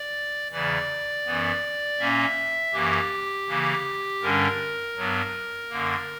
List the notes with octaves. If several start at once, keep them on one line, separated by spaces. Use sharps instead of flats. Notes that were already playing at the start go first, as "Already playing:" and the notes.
Already playing: D5
E2 C#3 E3 D5
F#2 E3 B3
A#2 A#3 C#4 E5
F#2 E3 A#3 G4
C#3 E3 A#3
G2 D3 G3 C#4 A#4
G2 F#3 B3
F#2 D3 A#3